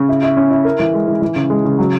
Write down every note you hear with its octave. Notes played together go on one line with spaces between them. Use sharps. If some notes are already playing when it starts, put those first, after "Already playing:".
Already playing: C#3
E4
E4
C#4
E4
A#4
E3
G#3
E3
E3
C#3
G#3
C#3
F#3